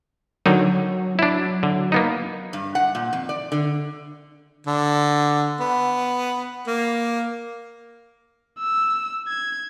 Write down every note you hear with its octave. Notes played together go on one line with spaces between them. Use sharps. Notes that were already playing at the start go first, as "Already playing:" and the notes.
D3 D#3 F#3 D#4
D4 E4
D3
A#3 B3 D#4
G2
F#5
A#2
F2
D5
D3
D3
B3
A#3
E6
G#6